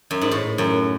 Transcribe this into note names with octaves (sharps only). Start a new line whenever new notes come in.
F#2
G#2
A2
F#2